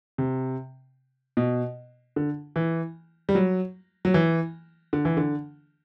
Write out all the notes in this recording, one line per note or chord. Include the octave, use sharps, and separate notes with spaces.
C3
B2
D3
E3
G3
F#3
F#3
E3
D3
E3
D3